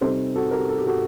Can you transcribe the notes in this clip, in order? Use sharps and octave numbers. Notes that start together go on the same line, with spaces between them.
C3 G3 C4 D#4 A4 C5
F#4 A4
G4 A#4
A4
G4
F#4 A4